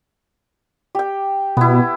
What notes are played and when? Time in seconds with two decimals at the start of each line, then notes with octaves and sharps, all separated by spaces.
0.95 G4 G5
1.57 B2 B3 E4